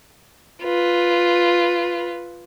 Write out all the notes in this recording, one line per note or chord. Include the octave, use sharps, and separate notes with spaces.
F4 B4